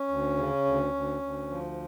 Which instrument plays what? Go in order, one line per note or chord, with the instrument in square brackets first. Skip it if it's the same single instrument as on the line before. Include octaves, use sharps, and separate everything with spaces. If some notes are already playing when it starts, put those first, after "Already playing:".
Already playing: [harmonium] C#4
D2
C#3
D2
D2
D2
F3